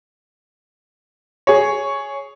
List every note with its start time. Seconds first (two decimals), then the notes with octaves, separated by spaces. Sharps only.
1.47 G#4 C#5